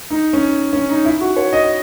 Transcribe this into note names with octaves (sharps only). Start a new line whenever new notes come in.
D#4
C#4
C#4
D#4
E4
F#4
C#5
D#5